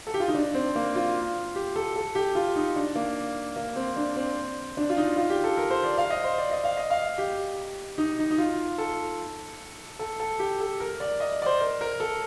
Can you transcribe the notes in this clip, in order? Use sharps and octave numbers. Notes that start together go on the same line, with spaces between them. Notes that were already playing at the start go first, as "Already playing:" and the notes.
A4
G4
F4
D#4
D4
C4
A#3
F4
G4
A4
A4
G4
F4
D#4
D4
A#3
A#3
C4
D4
C4
D4
F4
D#4
F4
G4
A4
A#4
C5
D5
F5
D#5
C5
D5
D#5
F5
D#5
F5
G4
D#4
D#4
D#4
F4
A4
A4
A4
G4
A4
A#4
D5
D#5
D5
C5
A#4
A#4
A4